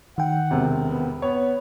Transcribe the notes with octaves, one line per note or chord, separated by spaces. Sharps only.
D#3 F#5 G5
E1 C3
B3
B3 C#5